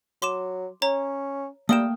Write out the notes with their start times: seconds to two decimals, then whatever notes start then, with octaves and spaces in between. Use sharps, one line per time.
0.22 F#3 C6 D6 E7
0.82 C#4 C#5 A#5
1.69 G3 A3 A#3 G5 D#6 E7